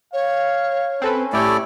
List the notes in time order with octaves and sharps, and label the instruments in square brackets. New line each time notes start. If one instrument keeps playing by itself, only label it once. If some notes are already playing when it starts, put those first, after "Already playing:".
[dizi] C#5 [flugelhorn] F5
[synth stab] C4 A4 B4 [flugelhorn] C#4
[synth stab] A2 G4 C#5 [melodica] A3 E4 D5